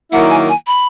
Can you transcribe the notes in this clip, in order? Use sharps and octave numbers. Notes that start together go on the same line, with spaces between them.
D#3 F#3 A#3 E4 F#5
G#5
G#5
B5